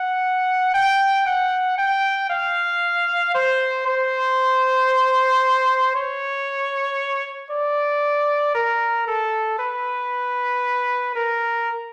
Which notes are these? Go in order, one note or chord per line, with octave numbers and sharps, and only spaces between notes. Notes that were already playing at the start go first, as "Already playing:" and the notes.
Already playing: F#5
G5
F#5
G5
F5
C5
C5
C#5
D5
A#4
A4
B4
A#4